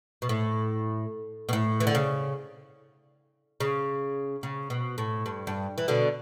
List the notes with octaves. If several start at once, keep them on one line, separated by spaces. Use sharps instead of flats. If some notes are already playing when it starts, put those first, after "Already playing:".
B2
A2
B2
A2
E3
D3
C#3
C#3
C#3
B2
A2
G2
G2
E3
B2 D3